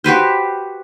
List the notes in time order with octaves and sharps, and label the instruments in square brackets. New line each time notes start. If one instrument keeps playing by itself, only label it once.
[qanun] F#4 G4 B4 C5